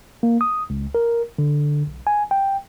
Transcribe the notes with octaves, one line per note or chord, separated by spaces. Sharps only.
A#3
D#6
C#2
A#4
D3
B1
G#5
G5